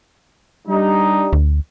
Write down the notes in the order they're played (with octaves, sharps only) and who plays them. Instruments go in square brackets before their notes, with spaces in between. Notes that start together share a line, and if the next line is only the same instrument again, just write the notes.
[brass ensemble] G3 D4 D#4
[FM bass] D2